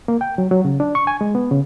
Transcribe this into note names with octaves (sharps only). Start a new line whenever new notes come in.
A#3
G5
F#3
F#3
C#3
D4
C#6
G#5
G#3
B3
C#3